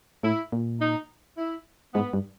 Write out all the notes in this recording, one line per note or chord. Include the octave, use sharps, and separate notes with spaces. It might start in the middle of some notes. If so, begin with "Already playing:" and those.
A2 E4
A#2
D#4
E4
G#2 B3
G2